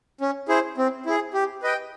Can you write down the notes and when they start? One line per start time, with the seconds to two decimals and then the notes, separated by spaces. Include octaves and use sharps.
0.21 C#4
0.49 E4 G#4 C5
0.78 C4
1.06 E4 G#4
1.34 G4
1.63 B4 D#5 G5